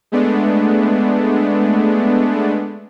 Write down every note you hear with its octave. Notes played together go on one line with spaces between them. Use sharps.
G#3 A3 B3 D4